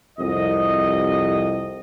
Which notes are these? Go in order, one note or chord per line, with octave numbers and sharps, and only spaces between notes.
C2 F2 C3 D#5